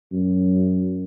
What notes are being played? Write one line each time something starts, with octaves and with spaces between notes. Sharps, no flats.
F#2